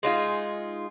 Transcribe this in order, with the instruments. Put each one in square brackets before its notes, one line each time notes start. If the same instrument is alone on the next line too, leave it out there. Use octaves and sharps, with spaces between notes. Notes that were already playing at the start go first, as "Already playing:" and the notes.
[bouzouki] G#3 D#4 F4 G#4